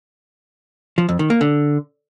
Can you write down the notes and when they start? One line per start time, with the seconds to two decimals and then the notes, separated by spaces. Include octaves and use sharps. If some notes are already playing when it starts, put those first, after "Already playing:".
0.98 F3
1.09 F2
1.19 D#3
1.30 A#3
1.41 D3